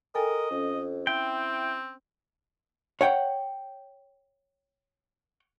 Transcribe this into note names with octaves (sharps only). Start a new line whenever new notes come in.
A4 A#4 D#5 G5 G#5
F2 C#4
C4 E4 G5
C#5 F#5 G5